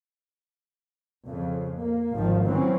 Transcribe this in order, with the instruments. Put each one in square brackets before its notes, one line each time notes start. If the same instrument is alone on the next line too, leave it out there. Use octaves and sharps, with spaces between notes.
[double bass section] F2 C#3
A#3
G#1 D#3 F3
E3 F#3 C4 C#4